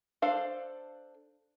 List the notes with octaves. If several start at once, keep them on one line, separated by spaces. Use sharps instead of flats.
D4 A4 C5 F5